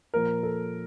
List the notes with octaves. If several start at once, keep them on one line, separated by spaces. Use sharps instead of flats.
A#2 F3 A#4
A4